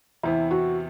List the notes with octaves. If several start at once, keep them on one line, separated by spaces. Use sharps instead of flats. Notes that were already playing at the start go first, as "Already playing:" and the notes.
E2 C3 E3 E4
F#4